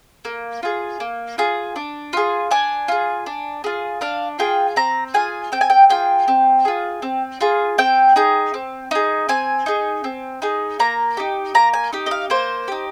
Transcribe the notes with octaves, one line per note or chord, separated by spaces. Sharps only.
A#3
F4 G#4
A#3
F4 G#4
D4
F4 G#4
D4 G#5
F4 G#4
D4
F4 G#4
D4 F5
F4 G#4 G5
C4 A#5
F4 G#4 G#5
C4 G5
G#5
G5
F4 G#4 G5
C4
F4 G#4
C4
F4 G#4
C4 G5
D#4 G#4
C4
D#4 G#4
C4 G#5
D#4 G#4
C4
D#4 G#4
A#3 A#5
D#4 G4
A#3 A#5
G#5
D#4 G4
D#5
F5
A#3 C5
D#4 G4